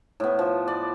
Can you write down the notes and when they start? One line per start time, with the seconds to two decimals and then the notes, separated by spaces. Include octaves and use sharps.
0.20 A2 B3
0.39 F3
0.68 D5